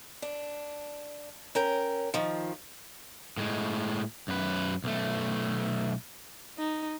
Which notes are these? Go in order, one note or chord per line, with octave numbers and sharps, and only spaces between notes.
D4
C#4 A#4 G5
D#3 F3
A2 G#3
F#2 B4
B1 A3
D#4